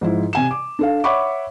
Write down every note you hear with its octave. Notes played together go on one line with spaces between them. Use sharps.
G#2 F3 E4
C3 G#5 E7
D6
D4 A4 F5
C#5 E5 F#5 B5 C#6 D6